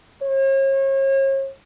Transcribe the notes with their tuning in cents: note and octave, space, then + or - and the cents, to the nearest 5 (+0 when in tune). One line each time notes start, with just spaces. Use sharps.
C#5 -40